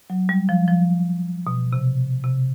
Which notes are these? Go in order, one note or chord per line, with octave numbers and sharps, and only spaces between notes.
F#3
G3
F3
F3
B2
C3
C3